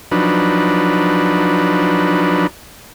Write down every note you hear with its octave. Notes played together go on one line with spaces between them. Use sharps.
F3 F#3 D4 D#4 B4